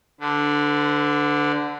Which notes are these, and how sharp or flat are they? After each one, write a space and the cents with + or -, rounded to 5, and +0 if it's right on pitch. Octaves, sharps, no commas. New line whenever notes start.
D3 +0 B4 +45